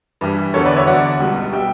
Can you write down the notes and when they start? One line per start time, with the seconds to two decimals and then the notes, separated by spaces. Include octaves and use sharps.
0.21 G2 E3 G3
0.54 E2 D3 F#3 A4 C#5
0.66 B4 D5
0.76 C#5 E5
0.87 E2 D3 F#3 D5 F#5
1.20 C#2 B2 G3
1.53 B2 G3 E5 G5